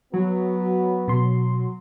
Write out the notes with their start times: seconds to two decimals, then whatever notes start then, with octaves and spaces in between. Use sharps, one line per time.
0.14 F#3 B3 F#4
1.08 B2 C6